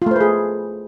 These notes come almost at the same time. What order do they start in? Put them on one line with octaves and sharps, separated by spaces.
F4 A3 C5 B4 G#4